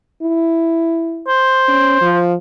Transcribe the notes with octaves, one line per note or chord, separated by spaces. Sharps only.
E4
C5
C#4
F3